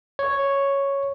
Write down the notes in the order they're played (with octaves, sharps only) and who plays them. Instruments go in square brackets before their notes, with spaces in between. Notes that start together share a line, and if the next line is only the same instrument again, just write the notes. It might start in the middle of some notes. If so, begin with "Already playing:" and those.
[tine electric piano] C#5